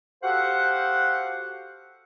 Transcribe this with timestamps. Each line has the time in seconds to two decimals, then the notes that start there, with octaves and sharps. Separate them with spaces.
0.23 F#4 G4 A4 C5 F5 F#5